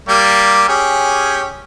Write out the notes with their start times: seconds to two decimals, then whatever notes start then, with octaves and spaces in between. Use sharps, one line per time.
0.09 G3 A#3 D6
0.69 C#4 G4 G#4